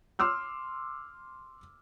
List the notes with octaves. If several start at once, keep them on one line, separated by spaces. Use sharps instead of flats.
C6 D6 E6 F6